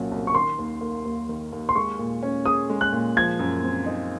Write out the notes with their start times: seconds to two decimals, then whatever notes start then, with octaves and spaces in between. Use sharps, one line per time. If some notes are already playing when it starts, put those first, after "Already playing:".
Already playing: C2 A#2 F#3 C#4
0.12 C2
0.27 C#6
0.34 D#3 C6
0.59 D#2
0.81 A#3
1.05 D#2
1.29 D#3
1.52 D#2
1.69 C6
1.75 G#3 C#6
1.99 A#2
2.23 C#4
2.45 G#4 D#6
2.70 G#3
2.81 F#6
2.93 A#2
3.17 F3 G#6
3.39 F#2
3.63 C4
3.86 D#4